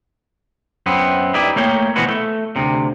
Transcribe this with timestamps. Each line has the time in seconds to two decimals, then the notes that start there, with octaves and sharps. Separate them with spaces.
0.86 F#2 B3 C4
1.34 D#4 E4 G4 B4 D5
1.56 A3 A#3 C#5 G5
1.96 B2 E3 F3 G#3 F#4 B4
2.09 A3
2.56 D2 C3